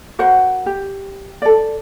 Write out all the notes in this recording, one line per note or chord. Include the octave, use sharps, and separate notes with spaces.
F#4 A#4 C5 F#5
G4
A4 D5